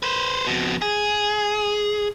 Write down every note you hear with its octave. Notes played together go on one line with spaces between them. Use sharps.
B4 C5
F2 B2
G#4